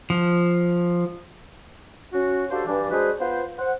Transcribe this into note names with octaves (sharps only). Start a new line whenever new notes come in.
F3
C#4 F#4
D4 F#4 G4 A4 C5 F5
G2 E3 D4
G#3 D4 F#4 G#4 B4 C5
B3 F4 B4 C5
C5 F#5